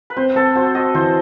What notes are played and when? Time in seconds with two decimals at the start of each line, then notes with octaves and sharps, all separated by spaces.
0.10 B4
0.17 C4 C5
0.36 C4 A4
0.55 F#4 C5
0.75 F#4 D#5
0.95 E3 C5